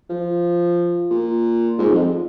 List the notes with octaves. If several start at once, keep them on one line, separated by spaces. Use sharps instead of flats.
F3
A#2
G#2
F2